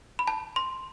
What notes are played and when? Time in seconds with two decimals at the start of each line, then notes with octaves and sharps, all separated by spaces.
0.19 B5
0.27 A5
0.56 C6